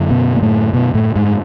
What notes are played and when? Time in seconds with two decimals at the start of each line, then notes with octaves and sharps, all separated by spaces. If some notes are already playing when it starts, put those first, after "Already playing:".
Already playing: F#2 D3
0.10 B2 B3
0.36 A#3
0.42 A2 A3
0.74 B2 B3
0.94 A2 A3
1.16 G#2 G#3